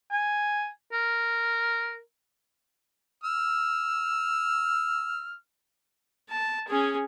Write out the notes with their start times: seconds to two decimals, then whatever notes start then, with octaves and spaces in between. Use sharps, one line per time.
0.11 G#5
0.92 A#4
3.24 E6 F6
6.30 A5
6.68 C#4 G#4